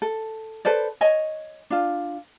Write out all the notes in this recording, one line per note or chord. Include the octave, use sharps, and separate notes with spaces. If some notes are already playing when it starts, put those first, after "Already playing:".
A4
A4 B4 C5 D5
C#5 D#5 G#5
D4 F4